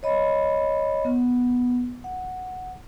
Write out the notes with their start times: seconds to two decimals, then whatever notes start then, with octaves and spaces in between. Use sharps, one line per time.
0.03 C#5 D#5 B5
1.05 B3
2.04 F#5